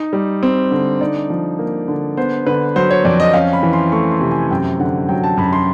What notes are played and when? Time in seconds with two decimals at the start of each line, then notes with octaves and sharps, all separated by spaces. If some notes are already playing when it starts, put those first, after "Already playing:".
Already playing: D#4
0.13 G3
0.43 C4
0.71 D3
1.01 D#4 D5
1.30 F3
1.59 A#3
1.88 D3
2.17 B3 C5
2.46 D3 B4
2.76 F#3 C5
2.91 C#5
3.05 F2 D5
3.20 D#5
3.34 C#4 F5
3.53 B5
3.63 E3
3.73 C6
3.92 A3 C#6
4.11 C6
4.21 C3
4.31 G#5
4.51 F#2 G5
4.79 D3 F#5
5.09 F#3 G5
5.24 A5
5.37 F#2 B5
5.53 C6